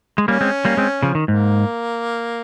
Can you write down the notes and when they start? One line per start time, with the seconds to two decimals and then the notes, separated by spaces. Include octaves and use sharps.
0.18 G#3
0.28 G3 A#3 C#4
0.41 G#3 C4
0.65 G3 A#3
0.77 G#3 C4
1.03 C#3 F3
1.15 D#3
1.28 G#2 A#3